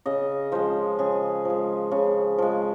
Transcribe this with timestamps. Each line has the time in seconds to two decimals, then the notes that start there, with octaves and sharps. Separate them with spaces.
0.06 C#3 D#5
0.52 F3 G#3 C5
0.99 C#3 G#4
1.45 F3 G#3
1.91 C#3
2.38 F3 G#3